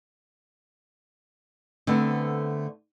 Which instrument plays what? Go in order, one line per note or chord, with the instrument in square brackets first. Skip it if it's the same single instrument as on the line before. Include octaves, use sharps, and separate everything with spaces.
[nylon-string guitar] D3 A3 B3 C4